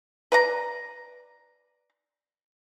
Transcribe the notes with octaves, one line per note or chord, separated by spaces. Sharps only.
B4 D5 A#5